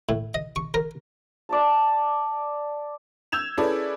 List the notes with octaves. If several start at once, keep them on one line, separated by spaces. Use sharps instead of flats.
A2
D#5
C#6
A#4
D5 E5 A5
E6 G6 G#6 E7 F7
C#4 E4 G#4 A4 B4 D5